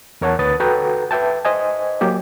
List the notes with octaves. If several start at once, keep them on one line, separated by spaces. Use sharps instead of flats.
E2 A#4 C#5 F#5 A5
D2 B4 D#6 A6
F#4 A4 B4 F#5 G5 A#5
B4 E5 G5 A5
C5 D#5 G#5
F#3 A#3 G4